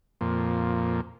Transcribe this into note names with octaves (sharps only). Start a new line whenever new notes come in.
F2 A#2